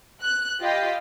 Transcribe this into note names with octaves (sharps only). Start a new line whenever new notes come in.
F#6
F4 G4 D#5 F5 G5 B5